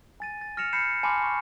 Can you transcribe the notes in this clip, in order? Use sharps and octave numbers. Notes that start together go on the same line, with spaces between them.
G#5 A6 D#7
A6
F6 A#6 C#7 E7 F7
B5 G6 C7 C#7 E7
G#5 A5 B5 C6 D6 F6
C#6